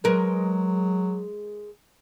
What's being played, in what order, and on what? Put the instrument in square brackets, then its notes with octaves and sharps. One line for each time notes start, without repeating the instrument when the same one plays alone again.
[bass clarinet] F#3 [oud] G#3 A#4 B4